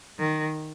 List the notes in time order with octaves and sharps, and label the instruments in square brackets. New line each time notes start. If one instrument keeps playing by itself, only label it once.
[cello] D#3